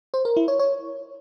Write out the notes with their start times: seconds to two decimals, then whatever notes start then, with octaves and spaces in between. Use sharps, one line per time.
0.14 C5
0.25 A#4
0.37 E4
0.48 C#5
0.59 C#5